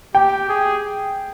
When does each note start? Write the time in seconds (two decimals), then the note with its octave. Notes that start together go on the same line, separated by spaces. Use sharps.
0.15 G4 G5
0.49 G#4